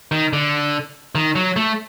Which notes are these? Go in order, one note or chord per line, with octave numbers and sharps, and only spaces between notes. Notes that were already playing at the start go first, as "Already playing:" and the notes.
D#3
D3
D#3
F#3
A3